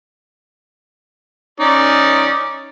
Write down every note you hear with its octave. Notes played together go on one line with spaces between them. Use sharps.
C#4 D#4 D5